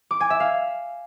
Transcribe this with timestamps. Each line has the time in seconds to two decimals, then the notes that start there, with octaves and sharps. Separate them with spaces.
0.11 D6
0.20 G#5
0.30 E5
0.40 F5